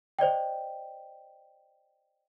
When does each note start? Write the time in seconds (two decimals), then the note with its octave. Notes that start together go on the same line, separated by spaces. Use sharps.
0.19 C5 D5 D#5 G5